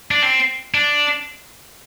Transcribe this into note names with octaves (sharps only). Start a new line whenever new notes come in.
D4
C4
D4